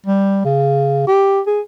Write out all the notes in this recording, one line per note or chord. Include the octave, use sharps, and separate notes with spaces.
G3
C#3
G4
G#4